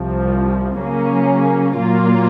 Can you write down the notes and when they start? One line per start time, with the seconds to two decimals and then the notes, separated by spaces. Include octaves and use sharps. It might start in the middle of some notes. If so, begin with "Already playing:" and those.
Already playing: C2 C3 F3
0.79 C#3 F#3 A#3 C#4
1.76 A#2 F#3 A#3 F4